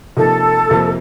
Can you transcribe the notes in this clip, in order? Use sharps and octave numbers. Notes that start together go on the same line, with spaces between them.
C3 F3 A#3 D#4 A4
F2 C3 F3 A#3